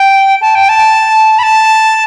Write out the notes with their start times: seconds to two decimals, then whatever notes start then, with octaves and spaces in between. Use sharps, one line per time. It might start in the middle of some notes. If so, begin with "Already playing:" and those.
Already playing: G5
0.41 A5
0.55 G5
0.69 A5
1.39 B5
1.43 A5